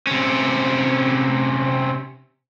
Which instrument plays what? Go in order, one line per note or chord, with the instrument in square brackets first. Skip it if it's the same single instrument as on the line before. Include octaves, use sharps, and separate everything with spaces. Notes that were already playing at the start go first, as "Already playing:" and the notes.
[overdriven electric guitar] C3 C#4